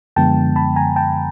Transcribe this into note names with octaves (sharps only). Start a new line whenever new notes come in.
F#2 D3 F3 G#3 B3 G5 A5
A5 B5
G#5 A#5
G5 A5